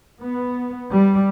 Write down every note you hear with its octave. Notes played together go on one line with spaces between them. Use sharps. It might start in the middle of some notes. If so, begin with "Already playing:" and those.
B3
G3